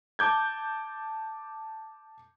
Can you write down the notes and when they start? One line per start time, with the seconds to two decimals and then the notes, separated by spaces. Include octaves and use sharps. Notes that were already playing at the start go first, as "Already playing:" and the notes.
0.19 A5 D6 G6 G#6